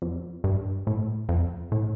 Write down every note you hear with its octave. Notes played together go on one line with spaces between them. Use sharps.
F2
G2
A2
F2
A2